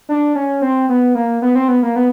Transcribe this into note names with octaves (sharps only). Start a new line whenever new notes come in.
D4
C#4
C4
B3
A#3
B3
C4
B3
A#3
B3